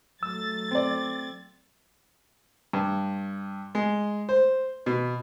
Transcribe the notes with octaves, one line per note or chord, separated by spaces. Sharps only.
F#3 A3 E6 A6
C4 D5
G2
G#3
C5
B2